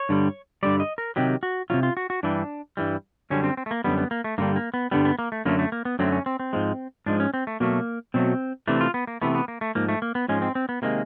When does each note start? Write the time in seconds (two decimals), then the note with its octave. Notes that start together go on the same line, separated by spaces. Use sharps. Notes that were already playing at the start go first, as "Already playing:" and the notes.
Already playing: C#5
0.09 G2 D3 G3
0.63 G2 D3 G3 D5
0.80 D#5
0.98 A#4
1.16 C3 D#3 F#3 G4
1.43 F#4
1.70 C3 D#3 F#3 F4
1.83 F4
1.97 F#4
2.10 F#4
2.23 G2 E3 G3 D4
2.77 G2 E3 G3
3.30 F#2 D3 G3 C#4
3.44 C4
3.57 C4
3.66 A3
3.71 A#3
3.84 F#2 D3 G3 B3
3.98 B3
4.11 A#3
4.24 A3
4.38 G2 D3 G3 A#3
4.56 A#3
4.74 B3
4.91 G2 D3 G3 B3
5.05 B3
5.19 A#3
5.32 A3
5.45 F#2 D3 F#3 A3 A#3
5.59 A3
5.72 A#3
5.85 B3
5.99 F#2 D3 F#3 A3 C4
6.12 C#4
6.26 C4
6.40 C4
6.53 G#2 F3 G#3
7.06 G#2 F3 G#3 D4
7.20 C#4
7.34 C4
7.47 A3
7.60 B2 F#3 A3 A#3
8.14 B2 F#3 A3 C4
8.68 C3 E3 A3 D4
8.81 F4
8.94 B3
9.07 A#3
9.22 C3 E3 A3 B3
9.35 B3
9.48 A#3
9.61 A3
9.75 G#2 F3 A#3
9.89 A3
10.02 A#3
10.15 B3
10.28 G#2 F3 G#3 C#4
10.42 C4
10.55 C4
10.69 B3
10.82 C3 D#3 G#3 A#3